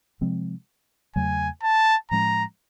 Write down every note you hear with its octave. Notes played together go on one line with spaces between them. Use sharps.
C3 F3 G#3 C4
E2 C#3 F#3 A3 G#5
A5
A2 F3 G#3 C#4 A#5